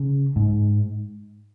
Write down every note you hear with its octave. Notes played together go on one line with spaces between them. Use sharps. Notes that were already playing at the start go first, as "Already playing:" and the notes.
Already playing: C#3
G#2